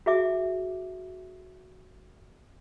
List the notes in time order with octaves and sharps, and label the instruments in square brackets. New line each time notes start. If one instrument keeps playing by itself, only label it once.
[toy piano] F#4 G#4 E5 D6